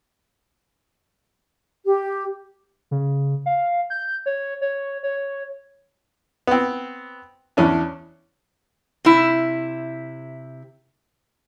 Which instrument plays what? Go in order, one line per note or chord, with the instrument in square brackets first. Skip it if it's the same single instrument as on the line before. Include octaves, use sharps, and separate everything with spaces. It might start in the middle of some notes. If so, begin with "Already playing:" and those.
[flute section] G4
[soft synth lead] C#3
F5
G6
C#5
C#5
C#5
[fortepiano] B3 C4
E2 C#4 D4
[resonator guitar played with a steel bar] C3 E4